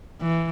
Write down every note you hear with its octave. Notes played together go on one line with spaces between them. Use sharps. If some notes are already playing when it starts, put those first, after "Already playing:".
E3